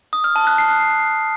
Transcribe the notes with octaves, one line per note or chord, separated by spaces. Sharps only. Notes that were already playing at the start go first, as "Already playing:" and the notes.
D#6
F6
A5
F#6
C7